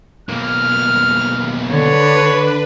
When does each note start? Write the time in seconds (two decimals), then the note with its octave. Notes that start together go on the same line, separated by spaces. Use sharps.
0.29 B1 A#3 F6
1.69 D3 D4 B4 C#5